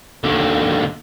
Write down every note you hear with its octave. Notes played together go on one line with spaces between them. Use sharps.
D#2 D3